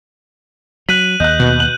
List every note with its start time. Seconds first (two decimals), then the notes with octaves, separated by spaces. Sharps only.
0.89 F#3 F#6 B6 D#7 F#7
1.20 D#2 D#5 F#6 G6
1.40 B2
1.60 F#7